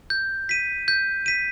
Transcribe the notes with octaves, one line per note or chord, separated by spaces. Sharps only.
G6
B6 D#7
G6
B6 D#7